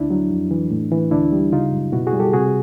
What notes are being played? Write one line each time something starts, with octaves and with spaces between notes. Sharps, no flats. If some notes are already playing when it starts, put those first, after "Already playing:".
Already playing: D2 D4 E4
F#3
F2
E3
A2
E3
D2 D4 E4
G3
C#3 D#4 F4
F#2
B2 E4 F#4
F#4 G#4
G3
G4 A4
C3 F#4 G#4